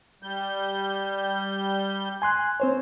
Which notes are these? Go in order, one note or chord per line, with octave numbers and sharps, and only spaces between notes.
G3 G6
G#5 C6 F#6
C4 C5 C#5